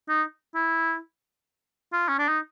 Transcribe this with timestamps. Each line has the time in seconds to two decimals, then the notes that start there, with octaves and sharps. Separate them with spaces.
0.09 D#4
0.55 E4
1.93 F4
2.08 C#4
2.19 D4
2.28 D#4